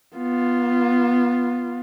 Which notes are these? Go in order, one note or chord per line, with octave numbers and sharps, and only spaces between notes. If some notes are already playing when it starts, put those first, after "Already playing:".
B3 F4